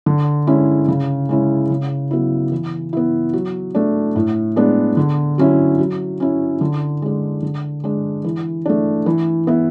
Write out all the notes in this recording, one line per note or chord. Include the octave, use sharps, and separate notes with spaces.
D3
G#3 C#4 E4
C#3
G#3 C#4 E4
C#3
F#3 B3 E4
E3
B3 E4
F#3
A3 D4
A2
G#3 B3 D4
D3
F#3 C#4 E4
F#3
C#4 E4
D3
G#3 D4
D3
G#3 D4
E3
A3 D4
E3
B3 E4